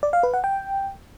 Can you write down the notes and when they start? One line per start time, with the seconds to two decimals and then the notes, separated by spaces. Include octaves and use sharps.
0.03 D5
0.13 F5
0.23 B4
0.34 F#5
0.44 G5